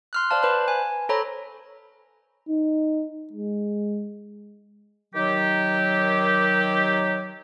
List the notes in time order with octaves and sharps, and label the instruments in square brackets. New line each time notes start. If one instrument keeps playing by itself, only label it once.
[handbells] C6 F6 F#6
C5 D5 F5 A5
B4 C5 B5 F#6
G#5
A4 C5 C#5 A#5 B5
[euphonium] D#4
G#3
[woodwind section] D#3 F#3 G4